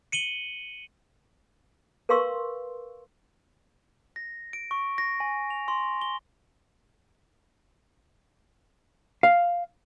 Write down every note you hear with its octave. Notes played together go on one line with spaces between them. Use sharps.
C#7 D#7 F#7 G7
A#4 B4 F5 C6 C#6 E6
A#6
D7
C#6
A#6
G#5
F7
C6
G7
F5